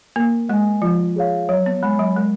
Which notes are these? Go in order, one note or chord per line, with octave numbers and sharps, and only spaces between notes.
A#3 A#4
G#3 D#5 G#5
F3 F4
G#4 C#5 F5
F#3 C#5
B3
G#3 G#5 B5
F#3
G#3 A#4